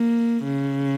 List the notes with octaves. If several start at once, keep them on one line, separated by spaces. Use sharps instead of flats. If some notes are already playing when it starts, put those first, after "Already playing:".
Already playing: A#3
C#3